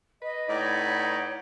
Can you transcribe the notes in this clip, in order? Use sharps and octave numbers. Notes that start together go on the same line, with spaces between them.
B4 D#5
A2 D#4 C#5 D5 F#5